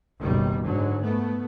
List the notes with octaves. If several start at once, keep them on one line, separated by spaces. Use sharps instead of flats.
F#1 B1 D#3 G3
G#2 D3 F#3
A3 B3